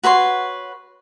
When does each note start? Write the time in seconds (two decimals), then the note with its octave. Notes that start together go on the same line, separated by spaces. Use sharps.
0.04 F#4 B4 C#5 C6